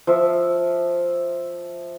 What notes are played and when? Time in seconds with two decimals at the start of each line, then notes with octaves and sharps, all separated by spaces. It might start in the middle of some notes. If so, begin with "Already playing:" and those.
0.07 F3 E5